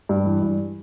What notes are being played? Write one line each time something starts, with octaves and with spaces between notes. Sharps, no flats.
G2
E3
G2